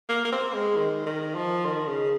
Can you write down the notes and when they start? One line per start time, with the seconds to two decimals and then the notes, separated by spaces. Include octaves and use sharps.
0.09 A#3
0.25 A#3
0.32 C4
0.53 G#3
0.76 D#3
1.06 D#3
1.35 F3
1.65 D#3
1.88 C#3